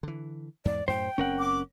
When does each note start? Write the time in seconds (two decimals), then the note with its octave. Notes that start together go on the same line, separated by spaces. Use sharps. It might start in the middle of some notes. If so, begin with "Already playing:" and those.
0.03 D3 E3
0.65 E2 G#2 D5
0.88 F#2 A2 C5 G5
1.18 F#1 C4 C#4 A#4 F#5
1.38 D6